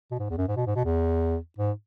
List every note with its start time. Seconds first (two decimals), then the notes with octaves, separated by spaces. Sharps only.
0.11 B2
0.19 G#2
0.30 E2
0.38 F#2
0.48 G#2
0.56 B2
0.67 G#2
0.76 B2
0.85 E2
1.58 G#2